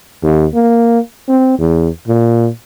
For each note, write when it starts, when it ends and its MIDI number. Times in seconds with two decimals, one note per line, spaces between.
0.23 0.46 39
0.54 0.99 58
1.29 1.56 60
1.59 1.89 40
2.08 2.49 46